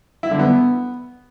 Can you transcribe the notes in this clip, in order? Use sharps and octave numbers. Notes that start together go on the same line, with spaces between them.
E4
D3
B3